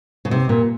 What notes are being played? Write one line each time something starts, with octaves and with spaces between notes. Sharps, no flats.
C#3
C3
A#2